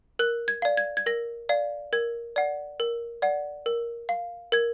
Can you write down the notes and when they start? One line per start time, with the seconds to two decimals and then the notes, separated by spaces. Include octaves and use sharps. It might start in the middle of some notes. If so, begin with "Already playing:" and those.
0.19 A#4 F#6
0.48 G#6
0.62 D5 F5
0.77 G#6
0.97 G#6
1.06 A#4 A#6
1.49 D5 F5
1.93 A#4 G#6
2.36 D5 F#5
2.80 A#4
3.22 D5 F#5
3.66 A#4
4.09 F5
4.52 A#4 G#6